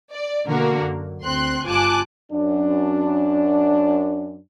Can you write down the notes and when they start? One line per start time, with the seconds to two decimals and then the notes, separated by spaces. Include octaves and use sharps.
0.11 D5
0.46 B2 D3 A#3 F#4 A#4
0.81 F#2
1.24 D2 C4 C6 F#6
1.65 G1 F4 G#5 A5 D6 F#6
2.32 F#2 D4